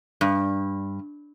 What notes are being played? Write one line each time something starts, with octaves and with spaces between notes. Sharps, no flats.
G2